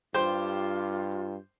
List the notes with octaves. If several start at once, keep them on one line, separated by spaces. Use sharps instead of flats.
G2 F4 G4 C5